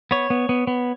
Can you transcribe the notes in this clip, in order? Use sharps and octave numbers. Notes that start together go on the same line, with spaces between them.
B3 C#5
B3
B3
B3